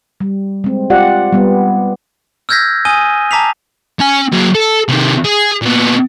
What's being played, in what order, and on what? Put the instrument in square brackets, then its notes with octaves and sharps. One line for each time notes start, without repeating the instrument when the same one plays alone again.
[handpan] G3
G#3 C4
F4 G4 D5 F#5
G3 B3
[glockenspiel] E6 F6 G6 G#6 A#6 B6
G#5 D#6 D#7 G7
A5 A#5 D6 B6 C7 F7
[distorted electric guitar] C#4 G#5
F#3 A#3
A4
C3 D#3
G#4
A#2 B3